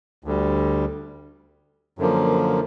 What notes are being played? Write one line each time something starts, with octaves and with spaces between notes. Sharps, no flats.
D2 D3 G3
F#2 D3 F3 A#3